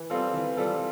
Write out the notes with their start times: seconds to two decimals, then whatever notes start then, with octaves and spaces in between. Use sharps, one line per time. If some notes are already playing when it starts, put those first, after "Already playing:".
Already playing: E3
0.10 G3 C4 F4 A4
0.34 E3
0.57 G3 C4 F4 A4